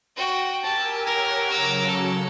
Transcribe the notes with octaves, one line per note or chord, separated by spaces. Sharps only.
F#4 G5
G4 A#4 G#5 A5 E6
A#4 C#5 F#5
C#3 F#3 D6 E6
A4